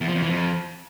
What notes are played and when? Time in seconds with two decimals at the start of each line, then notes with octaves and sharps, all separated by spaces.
0.01 E2
0.08 F3
0.15 F2
0.22 E3
0.30 F2